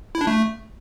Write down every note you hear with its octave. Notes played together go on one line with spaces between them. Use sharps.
E4
D4
A3